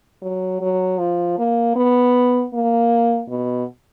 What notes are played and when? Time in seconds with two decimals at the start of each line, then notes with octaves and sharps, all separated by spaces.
0.22 F#3
0.61 F#3
0.99 F3
1.38 A#3
1.76 B3
2.54 A#3
3.30 B2